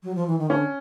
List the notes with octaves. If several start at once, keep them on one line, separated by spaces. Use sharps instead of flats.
F#3
F3
E3
D#3
D3 C#4